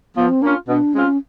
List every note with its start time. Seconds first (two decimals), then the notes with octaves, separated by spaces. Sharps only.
0.16 F3 B3
0.29 C4
0.42 A#3 C#4 D4 F4
0.68 B2 D4
0.93 G#3 C4 C#4 F4